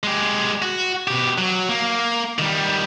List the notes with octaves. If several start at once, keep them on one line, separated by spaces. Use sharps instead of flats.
G#3 G4
F#4
B2 G4
F#3
A#3
D#3 G3